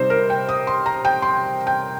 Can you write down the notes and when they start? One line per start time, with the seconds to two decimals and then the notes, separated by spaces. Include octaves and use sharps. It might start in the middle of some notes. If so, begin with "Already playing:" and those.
Already playing: C3 G3 D#4 C5
0.10 A#4
0.30 G5
0.49 D#6
0.67 C6
0.86 A#5
1.05 G5
1.22 C6
1.67 G5